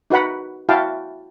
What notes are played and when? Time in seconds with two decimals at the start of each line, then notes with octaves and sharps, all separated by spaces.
0.10 D#4 F#4 B4 F#5 B5
0.69 E4 F#4 F5 G5 A5